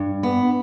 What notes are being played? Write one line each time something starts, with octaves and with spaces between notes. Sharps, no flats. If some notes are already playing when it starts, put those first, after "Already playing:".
Already playing: G2
B3